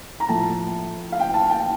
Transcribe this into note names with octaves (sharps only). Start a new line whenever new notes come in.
A#5
A2 F3 A5
F5
G5
A5
G5